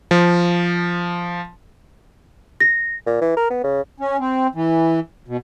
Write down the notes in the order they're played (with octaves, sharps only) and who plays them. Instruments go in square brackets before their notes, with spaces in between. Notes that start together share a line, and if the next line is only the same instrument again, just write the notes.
[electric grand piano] F3
[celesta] A#6
[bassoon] A#2
E3
A#4
B3
C#3
[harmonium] C#4
C4
E3
B2